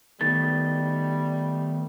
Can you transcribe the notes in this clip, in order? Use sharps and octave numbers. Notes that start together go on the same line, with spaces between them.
D#3 G3 A3 B3 A6